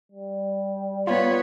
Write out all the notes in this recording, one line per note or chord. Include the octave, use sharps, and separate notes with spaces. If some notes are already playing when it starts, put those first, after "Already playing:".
G3
B3 F4 C#5